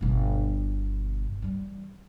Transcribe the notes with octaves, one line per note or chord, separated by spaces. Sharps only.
G1 B2
E3 G3